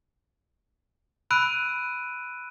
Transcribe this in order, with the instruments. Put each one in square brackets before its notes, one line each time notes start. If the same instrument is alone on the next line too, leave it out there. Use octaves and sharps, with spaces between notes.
[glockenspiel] B5 E6 F#6 D7 D#7